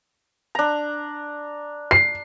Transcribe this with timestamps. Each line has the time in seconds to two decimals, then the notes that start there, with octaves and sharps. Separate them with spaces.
0.55 D4 A#5
1.91 C7